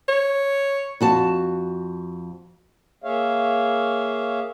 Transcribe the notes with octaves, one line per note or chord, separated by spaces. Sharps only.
C#5
F2 F#4 A5
A#3 G#4 C#5 E5 F5